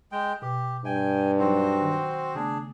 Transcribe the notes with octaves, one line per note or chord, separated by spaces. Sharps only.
G#3 G5
B2 G4
G2 E5 G5 G#5
F#3 C4 D#4 F#4 C5
D#3
C#3 A3 B3 D4 G#4